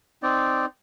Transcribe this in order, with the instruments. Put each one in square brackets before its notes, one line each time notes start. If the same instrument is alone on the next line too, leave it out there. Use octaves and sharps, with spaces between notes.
[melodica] C4 D#4 D5